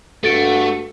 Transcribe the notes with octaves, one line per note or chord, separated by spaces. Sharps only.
G2 A3 F#4 A4 A6 D7